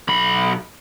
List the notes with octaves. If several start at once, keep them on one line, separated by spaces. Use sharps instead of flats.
B1 B5